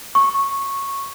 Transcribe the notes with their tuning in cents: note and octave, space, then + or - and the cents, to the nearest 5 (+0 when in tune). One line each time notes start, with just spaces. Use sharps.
C#6 -10